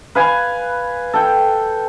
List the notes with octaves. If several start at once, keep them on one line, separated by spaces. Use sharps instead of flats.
B4 F5 G#5
A4 G5